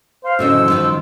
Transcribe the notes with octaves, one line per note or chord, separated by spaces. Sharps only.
C5 F5
A2 D3 C#4 F#4 D#5 E6
F#1 F#4
G2 D#3 F3